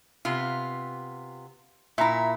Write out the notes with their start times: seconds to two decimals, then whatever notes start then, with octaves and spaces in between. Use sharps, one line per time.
0.25 C3 B3 F4
1.98 A#2 E4 E5 A#5